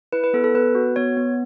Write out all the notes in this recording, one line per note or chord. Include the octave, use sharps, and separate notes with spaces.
E4 B4
B4
B3 A4
A4
B3 B4
F#4
B3 C#5
B3